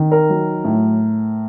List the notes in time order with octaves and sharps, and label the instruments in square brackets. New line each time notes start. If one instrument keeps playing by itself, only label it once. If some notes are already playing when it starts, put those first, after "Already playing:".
Already playing: [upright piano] D#3
A#4
F#3
A2